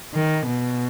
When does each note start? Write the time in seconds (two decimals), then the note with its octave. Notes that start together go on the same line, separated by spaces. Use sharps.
0.14 D#3
0.47 B2